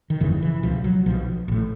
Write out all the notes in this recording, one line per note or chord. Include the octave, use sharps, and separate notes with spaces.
D#3
G1 F2 C#3 E3
E3
C#2 B2 F3
F#3
B1 B2 F3
A1 A2